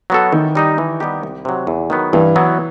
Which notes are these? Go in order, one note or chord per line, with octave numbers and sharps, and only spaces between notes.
F#3 B3 F#4 A4
D#3 E3
G3 D#4 G4 D#5
E3
G3 B3 D#4 G4
C2
C3 F#3
E2
D#3 F#3 B3
G2 E3
F#3 B3 E4